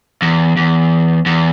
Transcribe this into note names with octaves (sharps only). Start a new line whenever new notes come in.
E2
E2
E2